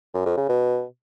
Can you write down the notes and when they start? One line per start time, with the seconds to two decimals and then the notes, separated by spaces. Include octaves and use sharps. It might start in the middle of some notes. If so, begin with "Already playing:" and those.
0.14 F#2
0.26 F2
0.37 C#3
0.49 B2